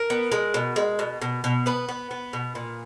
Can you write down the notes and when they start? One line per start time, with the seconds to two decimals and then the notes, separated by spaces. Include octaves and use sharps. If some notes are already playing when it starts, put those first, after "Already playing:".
Already playing: A#4
0.10 B3
0.32 G#3
0.54 B2
0.76 G#3
0.99 B2
1.22 B2
1.44 B2
1.66 B3 B4
1.89 B3
2.11 B3
2.33 B2
2.55 A#2